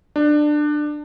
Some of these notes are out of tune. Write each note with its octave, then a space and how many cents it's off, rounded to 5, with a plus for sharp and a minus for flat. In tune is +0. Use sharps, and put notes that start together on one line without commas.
D4 +20